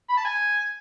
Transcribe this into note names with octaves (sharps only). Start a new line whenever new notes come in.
B5
A5
G#5